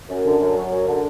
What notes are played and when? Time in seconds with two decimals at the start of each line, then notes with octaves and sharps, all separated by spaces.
0.09 F#2
0.25 D3
0.40 F#2
0.56 F#3
0.72 F#2
0.87 D3